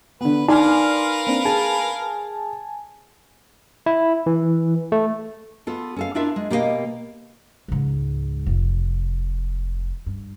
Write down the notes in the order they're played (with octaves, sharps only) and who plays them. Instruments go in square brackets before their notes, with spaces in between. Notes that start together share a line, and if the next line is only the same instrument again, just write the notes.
[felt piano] D3 B3 [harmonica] B4
[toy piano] D#4 [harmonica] A#4 B4 F5 [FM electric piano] D5 C6 F6 [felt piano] G#5
[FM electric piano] A#3 C4 D4
[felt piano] G#4 [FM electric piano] G#5 A5
[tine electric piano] E4
E3
A3
[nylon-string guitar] B3 F4 A4
C#4 A4 F5
D4 E4 F4 A#4 E5
G#3
B2 A#3 G4 G#4 D#5 F5
[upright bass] C#2 G#2
F1
G2